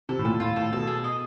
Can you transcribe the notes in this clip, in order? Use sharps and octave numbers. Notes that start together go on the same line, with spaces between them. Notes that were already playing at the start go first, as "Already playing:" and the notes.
C3 A4
A2
A#2 A4
A2 F4
A2 A4
B2 A4
G#4
D#5